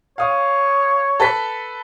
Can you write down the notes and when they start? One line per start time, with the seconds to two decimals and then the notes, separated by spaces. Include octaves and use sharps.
0.18 C#5 F5 D#6
1.20 A4 B4 B6